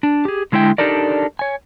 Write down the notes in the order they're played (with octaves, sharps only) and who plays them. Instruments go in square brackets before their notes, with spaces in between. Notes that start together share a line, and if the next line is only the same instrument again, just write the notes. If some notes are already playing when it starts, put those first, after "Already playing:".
[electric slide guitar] D4
G4 G#4
D3 G#3 E4 C#5 G5
D4 D#4 G4 A4 A#4 D5
C#5 G#5